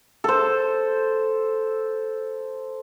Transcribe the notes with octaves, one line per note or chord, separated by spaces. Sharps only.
A4 C5